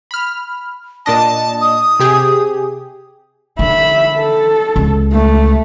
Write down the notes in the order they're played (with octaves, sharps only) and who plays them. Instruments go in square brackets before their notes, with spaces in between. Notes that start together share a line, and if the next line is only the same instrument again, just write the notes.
[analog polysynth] B5 F6
[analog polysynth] A#2 D4 D#5 [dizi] A5
[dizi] D#6
[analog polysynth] C3 G4 G#4
[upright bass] D3 [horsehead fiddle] E5 B5
[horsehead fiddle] A4
[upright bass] C#2
[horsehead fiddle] A3